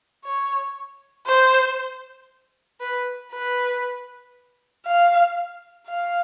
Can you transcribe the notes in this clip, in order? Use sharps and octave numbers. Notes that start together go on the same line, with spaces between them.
C#5
C5
B4
B4
F5
F5